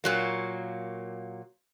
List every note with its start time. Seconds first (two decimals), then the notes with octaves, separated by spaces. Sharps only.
0.04 A#2 F#3 A#3